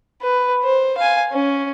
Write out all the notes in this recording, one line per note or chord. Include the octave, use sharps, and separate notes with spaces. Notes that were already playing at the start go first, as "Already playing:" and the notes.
B4
C5
F5 G#5
C#4